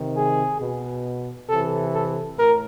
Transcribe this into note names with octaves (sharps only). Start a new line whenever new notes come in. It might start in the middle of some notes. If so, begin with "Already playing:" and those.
Already playing: C3 D#3
G#4
B2
C3 E3 A4
A4
A2 A#4